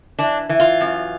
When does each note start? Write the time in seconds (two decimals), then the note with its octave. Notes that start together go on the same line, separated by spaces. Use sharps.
0.19 E3 D4
0.49 E3
0.60 F4
0.81 F#2